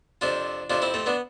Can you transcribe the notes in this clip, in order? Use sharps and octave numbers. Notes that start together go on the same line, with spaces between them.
F2 C3 F3 D4 F4
F2 C3 F3 D4 F4
C4 E4
A3 C4
B3 D4